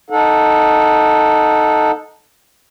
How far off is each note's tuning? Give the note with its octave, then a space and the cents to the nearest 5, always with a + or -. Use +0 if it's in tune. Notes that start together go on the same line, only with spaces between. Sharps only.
D#4 +0 A4 +0 F#5 -30